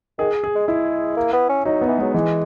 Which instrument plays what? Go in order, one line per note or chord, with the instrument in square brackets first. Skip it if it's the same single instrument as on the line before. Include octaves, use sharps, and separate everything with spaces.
[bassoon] D#3 [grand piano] G#4
[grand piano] G#4
[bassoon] G#3
[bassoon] G#3 [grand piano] E4
[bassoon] A#3
B3
C#4
[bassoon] F#3 [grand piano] D#4
[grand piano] B3
[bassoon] E3
[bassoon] F#3 [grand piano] G#3
[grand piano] E3 [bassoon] G#3